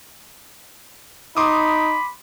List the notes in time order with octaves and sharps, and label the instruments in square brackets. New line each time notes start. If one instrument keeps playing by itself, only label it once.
[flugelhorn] D#4 [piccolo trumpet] B5 [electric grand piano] C6 D6 D#6